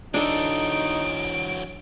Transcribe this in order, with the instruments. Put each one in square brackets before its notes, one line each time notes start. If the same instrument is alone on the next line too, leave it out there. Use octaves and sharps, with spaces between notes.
[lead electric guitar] E3 F#3 [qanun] D4 A4 [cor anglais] D#4 [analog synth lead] D7